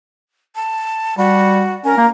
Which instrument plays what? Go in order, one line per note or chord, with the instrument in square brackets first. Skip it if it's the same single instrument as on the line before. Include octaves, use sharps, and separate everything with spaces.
[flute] A5
[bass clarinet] G3 [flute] F#4
[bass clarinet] C#4 [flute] A#4
[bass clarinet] A#3